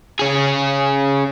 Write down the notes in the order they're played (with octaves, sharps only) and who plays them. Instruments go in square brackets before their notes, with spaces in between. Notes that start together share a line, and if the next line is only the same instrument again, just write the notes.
[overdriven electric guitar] C#4 G#4